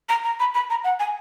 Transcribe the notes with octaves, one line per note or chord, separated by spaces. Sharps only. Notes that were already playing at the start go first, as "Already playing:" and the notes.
A#5
A#5
B5
B5
A#5
F#5
G#5